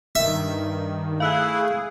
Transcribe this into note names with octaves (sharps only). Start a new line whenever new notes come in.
G2 D#3 E5
A3 E4 G#4 F5 E6 F#6